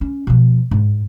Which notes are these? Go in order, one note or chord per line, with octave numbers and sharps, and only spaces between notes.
C#4
B2 F3
G#2